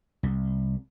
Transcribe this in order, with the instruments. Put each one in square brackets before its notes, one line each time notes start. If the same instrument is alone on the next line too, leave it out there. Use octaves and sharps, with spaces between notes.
[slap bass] C2